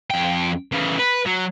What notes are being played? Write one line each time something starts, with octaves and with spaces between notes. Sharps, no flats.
F2 G5
C#3 E3
B4
F#3